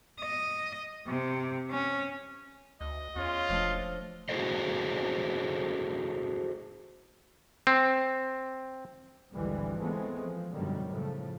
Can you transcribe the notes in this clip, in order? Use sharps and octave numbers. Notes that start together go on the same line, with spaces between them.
D#5
C3
C#4
D2 D#5
E2 C#4 F4 C#5
E1 F3 A3 D4
E4 F#4 G#4 A4 C5 D#5
C4
G#1 D2 E3 G3 G#3
E3 F3 G#3 A3 B3 C4
F3
F#2 B2 D3 D#3 F#3 G3
A2 C#3 F3 A3